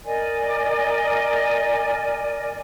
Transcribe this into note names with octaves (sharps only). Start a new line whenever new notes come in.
A#4 D5 D#5 G#5